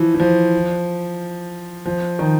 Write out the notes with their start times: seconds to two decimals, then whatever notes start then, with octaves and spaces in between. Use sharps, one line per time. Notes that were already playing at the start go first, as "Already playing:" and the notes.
Already playing: E3 F3
0.14 E3
0.20 F3
1.86 F3
2.19 D#3